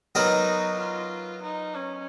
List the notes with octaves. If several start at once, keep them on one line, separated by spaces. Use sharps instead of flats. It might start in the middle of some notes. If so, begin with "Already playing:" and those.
F#3 B3 D#4 F#4 A#4 D#5
F4
D#4
C#4